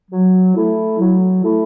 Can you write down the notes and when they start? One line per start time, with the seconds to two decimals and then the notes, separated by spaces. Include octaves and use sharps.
0.10 F#3
0.54 A3 E4
0.98 F#3
1.42 A3 E4